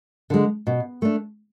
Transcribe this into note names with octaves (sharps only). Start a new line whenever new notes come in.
D3 G#3
B2
A3 D4